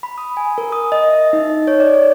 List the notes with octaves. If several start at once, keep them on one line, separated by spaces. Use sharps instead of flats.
B5
D#6
G#5
A#4
D#6
D#5
E5
D#4
D#5
C#5
D5
C#5